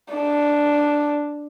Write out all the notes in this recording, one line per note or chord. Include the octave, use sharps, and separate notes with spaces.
D4